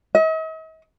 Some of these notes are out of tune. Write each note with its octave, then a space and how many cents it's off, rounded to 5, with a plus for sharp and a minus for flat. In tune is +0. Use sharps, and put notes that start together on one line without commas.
D#5 +45